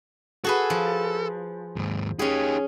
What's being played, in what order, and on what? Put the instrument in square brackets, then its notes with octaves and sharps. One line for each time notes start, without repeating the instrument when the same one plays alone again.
[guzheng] F#4 G#4 B4 [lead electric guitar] A4
[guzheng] F3
[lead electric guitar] D#2 G#2
[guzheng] C#4 G#4 [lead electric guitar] D#4 G4